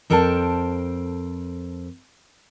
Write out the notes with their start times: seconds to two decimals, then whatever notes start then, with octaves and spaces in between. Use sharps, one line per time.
0.10 F2 A4 A#4 C5 G5 A5